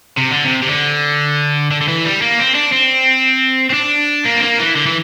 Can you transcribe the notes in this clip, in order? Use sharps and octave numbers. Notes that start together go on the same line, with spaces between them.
C3
D3
C3
C3
D3
D3
D3
E3
G3
A#3
C4
D4
C4
C4
D4
A#3
C4
A#3
E3
D3
E3